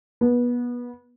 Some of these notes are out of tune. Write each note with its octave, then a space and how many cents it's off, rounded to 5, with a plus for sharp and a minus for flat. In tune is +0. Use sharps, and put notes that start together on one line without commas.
B3 -25